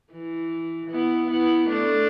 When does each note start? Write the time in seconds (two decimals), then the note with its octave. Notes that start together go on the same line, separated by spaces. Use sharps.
0.13 E3
0.91 B3 E4
1.30 B3 E4
1.69 A3 D4